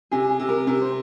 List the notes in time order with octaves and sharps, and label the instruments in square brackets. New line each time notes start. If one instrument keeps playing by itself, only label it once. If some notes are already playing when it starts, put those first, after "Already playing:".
[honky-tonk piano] C3 [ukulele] G#4
[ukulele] G#4
[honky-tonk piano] C3
[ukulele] A#4
[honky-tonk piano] C3 [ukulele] A#4
[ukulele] C5